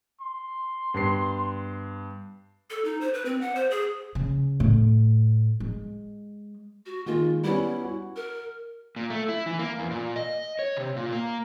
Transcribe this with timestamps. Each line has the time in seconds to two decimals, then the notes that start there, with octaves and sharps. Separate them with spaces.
0.21 C6
0.94 G2 B3 C7
2.70 A4
2.85 D#4
3.01 C5
3.14 B4
3.25 C4
3.41 F#5
3.56 C5
3.70 G#4
4.15 C#3
4.60 A2
5.60 G#3
6.86 F#4
7.06 D#3 G#3 A#3 F4
7.44 G3 B3 C#4 E4
7.83 F#4
8.16 A#4
8.96 A#2
9.10 A3
9.29 E4
9.46 E3
9.59 A#3
9.79 E2
9.90 A#2
10.16 D#5
10.59 C#5
10.77 C3
10.96 A#2
11.12 A#3